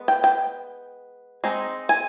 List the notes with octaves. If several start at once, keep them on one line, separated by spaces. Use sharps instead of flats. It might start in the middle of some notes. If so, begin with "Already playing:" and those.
Already playing: G#3 B3
G5
G5
G#3 C4 D#4
G#5